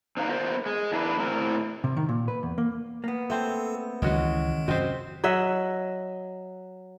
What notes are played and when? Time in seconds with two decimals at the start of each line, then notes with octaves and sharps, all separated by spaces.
0.17 C4 D#4 B4 F5 F#5 A#5
0.28 B3 F4 A#4 C5
0.66 G#3
0.92 E2 D4 E4 A#4 B4
1.19 A2 C4 A#4
1.84 C3
1.97 D#3
2.09 A#2
2.28 B4
2.43 E2
2.58 A#3
3.04 A#3 B3
3.30 A3 C4 A4 C5
4.02 C#2 D#3 E3 G#3 C#4 F#4
4.68 F#2 C3 C4 F#4 C5 D#5
5.24 F#3 D#5 E5 F#5